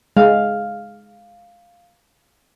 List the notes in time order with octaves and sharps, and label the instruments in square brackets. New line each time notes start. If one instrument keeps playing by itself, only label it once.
[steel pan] G#3 [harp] F5